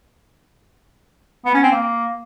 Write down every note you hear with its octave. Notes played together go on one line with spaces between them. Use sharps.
B3
C#4
C4
A#3